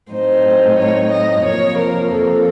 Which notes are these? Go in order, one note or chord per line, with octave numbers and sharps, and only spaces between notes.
A2 F#3 C4 D#4 C5
C#5
D#5
F2 C3 F3 A#3 C#5
A#4
A4